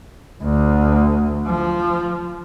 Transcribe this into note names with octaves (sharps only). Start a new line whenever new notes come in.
D2
F3